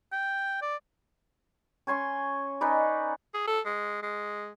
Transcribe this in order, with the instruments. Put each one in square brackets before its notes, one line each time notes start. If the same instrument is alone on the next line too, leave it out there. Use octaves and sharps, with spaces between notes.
[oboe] G5
D5
[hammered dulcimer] C#4 G#5 C6 C#6
C#4 D#4 B4 D5
[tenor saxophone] G#4
A4
G#3
G#3